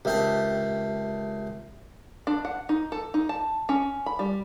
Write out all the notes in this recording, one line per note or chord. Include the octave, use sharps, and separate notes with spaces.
C#2 C4 G4 A#4 E5 A5
D4
F#5
D#4
A4
D#4
A5
C#4
B5
G3